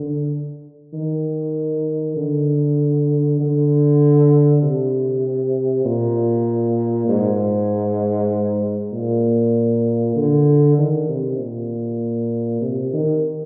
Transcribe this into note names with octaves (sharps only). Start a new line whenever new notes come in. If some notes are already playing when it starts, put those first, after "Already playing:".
Already playing: D3
D#3
D3
D3
C3
A#2
G#2
A#2
D3
D#3
C3
A#2
C3
D#3